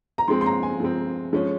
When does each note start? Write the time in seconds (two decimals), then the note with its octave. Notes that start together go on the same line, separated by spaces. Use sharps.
0.18 A#5
0.28 F3 G#3 C4 C6
0.41 C6
0.46 A#5
0.63 G#5
0.80 F3 G#3 C4
1.33 F3 G#3 C#4